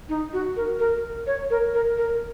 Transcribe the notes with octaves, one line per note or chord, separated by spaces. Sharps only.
D#4
F#4
A#4
A#4
C#5
A#4
A#4
A#4